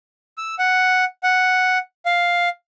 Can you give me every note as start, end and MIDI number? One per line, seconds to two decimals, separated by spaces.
0.38 0.55 88
0.59 1.05 78
1.23 1.78 78
2.06 2.49 77